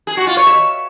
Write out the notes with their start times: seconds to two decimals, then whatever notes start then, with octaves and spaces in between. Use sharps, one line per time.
0.07 G#4
0.17 F#4
0.27 F4
0.37 C#5
0.47 E5